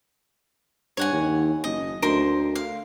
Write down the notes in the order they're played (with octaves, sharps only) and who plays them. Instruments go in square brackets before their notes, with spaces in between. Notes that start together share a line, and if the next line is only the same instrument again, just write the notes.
[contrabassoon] G2 [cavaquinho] C#5 F#5 G#5
[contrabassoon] D#2
[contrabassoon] F#1 [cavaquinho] D#5
[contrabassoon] D2 [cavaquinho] A#4 C5 C6
[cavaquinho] F5